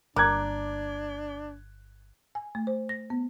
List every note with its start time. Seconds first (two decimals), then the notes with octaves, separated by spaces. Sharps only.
0.16 G1 A#3 D4 D6 F#6 G#6
2.35 G#5
2.55 A3
2.67 C5
2.89 A#6
3.10 B3